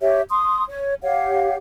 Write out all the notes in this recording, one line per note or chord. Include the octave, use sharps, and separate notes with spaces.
G4 C#5 E5
C6 D#6
C#5
G4 C#5 F5 F#5